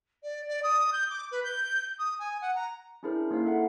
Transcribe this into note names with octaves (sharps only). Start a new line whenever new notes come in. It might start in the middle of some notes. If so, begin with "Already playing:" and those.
D5
D5
D#6
G6
D6
B4
G6
D#6
G#5
F#5
A#5
C#4 D4 E4 G#4 A#4 C5
A#3 D#4 E4 C5 F5
A4 E5 F#5